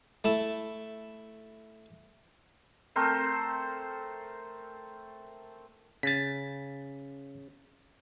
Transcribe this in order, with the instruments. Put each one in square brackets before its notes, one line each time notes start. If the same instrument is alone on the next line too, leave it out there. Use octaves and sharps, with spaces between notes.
[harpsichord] A3 E4 A5
[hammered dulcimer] A3 C4 A#4 C5
[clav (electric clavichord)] C#3 [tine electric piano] A6 B6